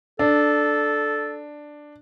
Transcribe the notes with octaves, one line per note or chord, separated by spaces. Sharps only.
D4 A4